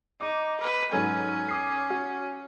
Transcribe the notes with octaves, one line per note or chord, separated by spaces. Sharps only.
D#4 D6
B4
G#2 F#3 C#4 A4
D6 D#6 C7
F#4